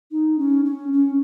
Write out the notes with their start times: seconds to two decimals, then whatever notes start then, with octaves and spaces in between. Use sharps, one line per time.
0.11 D#4
0.39 C#4
0.65 C#4
0.93 C#4